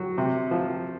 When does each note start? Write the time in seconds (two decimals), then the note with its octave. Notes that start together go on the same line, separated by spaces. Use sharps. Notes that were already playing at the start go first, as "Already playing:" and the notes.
Already playing: F#3
0.18 C3
0.51 F3